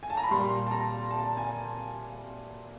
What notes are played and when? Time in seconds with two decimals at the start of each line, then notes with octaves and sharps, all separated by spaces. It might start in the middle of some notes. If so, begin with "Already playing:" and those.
0.03 G#5
0.10 A5
0.17 A#5
0.23 B5
0.31 A#2 G3 C6
0.66 A5
0.71 A#5
1.11 A5
1.37 G#5